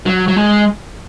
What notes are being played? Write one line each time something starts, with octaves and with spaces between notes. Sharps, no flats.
F#3
F#3
G#3